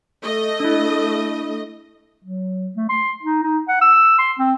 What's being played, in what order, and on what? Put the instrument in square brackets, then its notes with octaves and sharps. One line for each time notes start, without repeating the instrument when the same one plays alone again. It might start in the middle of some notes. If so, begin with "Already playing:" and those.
[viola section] A3 D#5
[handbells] D4 E4
[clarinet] F#3
A3
C6
D#4
D#4
F#5
E6
C6
C4